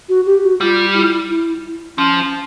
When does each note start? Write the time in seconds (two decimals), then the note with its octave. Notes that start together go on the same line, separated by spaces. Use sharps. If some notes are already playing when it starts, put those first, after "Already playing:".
0.09 F#4
0.26 G4
0.43 F#4
0.61 G3 F4
0.94 E4
1.29 E4
1.97 F3 C#4